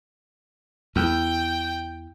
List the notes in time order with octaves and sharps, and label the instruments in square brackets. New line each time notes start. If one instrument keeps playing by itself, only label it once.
[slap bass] E2 [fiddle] G5